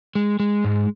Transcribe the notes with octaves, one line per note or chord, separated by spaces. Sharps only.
G#3
G#3
G#2